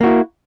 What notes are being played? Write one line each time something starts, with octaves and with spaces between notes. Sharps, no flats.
A#3 E4 F#4